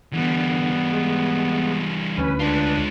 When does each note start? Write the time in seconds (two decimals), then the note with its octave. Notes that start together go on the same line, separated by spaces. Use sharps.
0.14 D3 E3 G3 B3
0.92 G#3
2.17 D2 C#4 B4
2.40 G#3 D4 F4